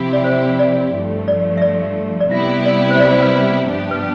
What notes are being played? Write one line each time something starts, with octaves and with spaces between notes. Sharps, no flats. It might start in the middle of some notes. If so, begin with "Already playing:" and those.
Already playing: C3 F3 C4 E4 G4
D5
C5
D5
G2 F3 A3
D5
E5
D5
D5
C3 G3 B3 E4 G4 E5
D5
C5
D5
C5
B4
G2 F3 B3 D4 G4
B4